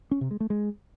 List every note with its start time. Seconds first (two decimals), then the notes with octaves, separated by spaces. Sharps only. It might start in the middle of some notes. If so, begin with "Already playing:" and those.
0.11 C#4
0.21 C3
0.31 G#3
0.40 A3
0.50 G#3